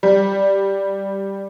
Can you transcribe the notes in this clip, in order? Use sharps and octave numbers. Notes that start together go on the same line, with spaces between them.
G3